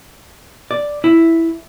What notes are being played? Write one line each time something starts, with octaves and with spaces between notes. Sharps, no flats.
D5
E4